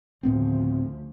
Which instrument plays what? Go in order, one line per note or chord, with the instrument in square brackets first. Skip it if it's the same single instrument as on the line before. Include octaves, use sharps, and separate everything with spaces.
[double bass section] D2 C#3 F3 [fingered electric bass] A2 B3 C4